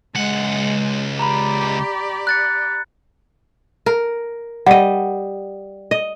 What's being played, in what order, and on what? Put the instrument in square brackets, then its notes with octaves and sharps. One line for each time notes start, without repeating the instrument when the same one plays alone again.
[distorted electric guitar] C#2 F#5 [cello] G#3
[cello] G4 D5 [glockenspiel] A#5 B5
[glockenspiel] F#6 A6 C#7
[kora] A#4
[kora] G3 D#5 [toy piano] F#5
[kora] D#5